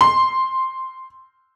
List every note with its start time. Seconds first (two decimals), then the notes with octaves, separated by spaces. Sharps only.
0.01 C6